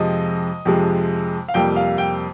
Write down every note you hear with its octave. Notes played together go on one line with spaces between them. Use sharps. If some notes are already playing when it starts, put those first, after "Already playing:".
Already playing: F2 C3 F3 G#3 D#5
F2 C3 F3 G#3
F5
F2 C3 G3 A#3 G5
F5
G5